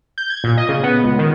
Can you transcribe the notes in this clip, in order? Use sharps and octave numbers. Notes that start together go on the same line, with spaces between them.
G6
G#6
A#2
D#5
C#3
B3
C#2
D#3